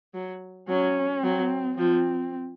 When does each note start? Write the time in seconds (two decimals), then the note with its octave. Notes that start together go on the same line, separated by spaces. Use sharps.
0.14 F#3
0.69 F#3 C#4
1.23 F#3 C4
1.78 F3 C4